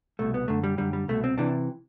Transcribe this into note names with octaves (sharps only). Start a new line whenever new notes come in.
C2 B2 A3
B3
F#2 D3 A3
G3
F#2 D3 G3
G3
C2 B2 A3
C4
C3 E3 D4